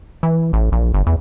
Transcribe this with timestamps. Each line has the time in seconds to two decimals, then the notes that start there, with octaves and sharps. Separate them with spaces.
0.23 E3
0.53 A1
0.72 A#1
0.94 G1
1.07 E2